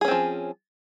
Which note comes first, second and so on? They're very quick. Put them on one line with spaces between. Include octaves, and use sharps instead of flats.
G#4 C#4 C4 F3